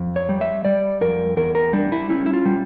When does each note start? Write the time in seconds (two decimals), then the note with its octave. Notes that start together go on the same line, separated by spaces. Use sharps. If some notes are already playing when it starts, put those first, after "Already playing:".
Already playing: F2
0.16 C#5
0.29 G3
0.41 E5
0.65 G3 D5
1.01 F2 A#4
1.37 E2 A#4
1.55 A#4
1.73 G3 D4
1.92 E4
2.09 C#4 E4
2.26 E4
2.33 F4
2.46 G3